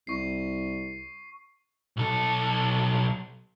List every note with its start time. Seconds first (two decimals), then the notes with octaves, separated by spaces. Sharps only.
0.07 C2 C#6 C7
1.97 B1 A4